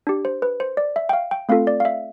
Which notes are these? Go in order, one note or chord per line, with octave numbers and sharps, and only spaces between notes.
D4 G4
C5
B4
C5
D5
E5
G5
F5
G5
A3 C4 F4 A4 F5
D5
F5
E5